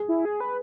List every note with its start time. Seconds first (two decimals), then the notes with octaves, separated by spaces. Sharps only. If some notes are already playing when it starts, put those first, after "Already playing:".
Already playing: G#4
0.08 E4
0.25 G#4
0.40 B4